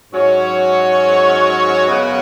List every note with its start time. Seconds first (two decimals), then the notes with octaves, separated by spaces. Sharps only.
0.12 G#2 F#3 C#4 F#4 C#5
1.86 F#2 C#3 G#3 B3 F#4